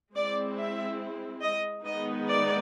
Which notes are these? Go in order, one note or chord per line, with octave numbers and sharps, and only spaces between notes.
G#3 C4 E4 D5
E5
D#5
D#3 G#3 B3 D#4 D#5
D5